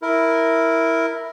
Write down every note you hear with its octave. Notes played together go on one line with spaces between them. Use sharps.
E4 A#4